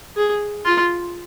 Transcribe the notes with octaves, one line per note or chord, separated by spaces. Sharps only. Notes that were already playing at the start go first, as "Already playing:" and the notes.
G#4
F4